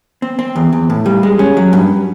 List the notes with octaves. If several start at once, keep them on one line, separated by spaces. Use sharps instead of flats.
C4
C4
E2
E2
A2
G3
G#3
C#4
F#3
G2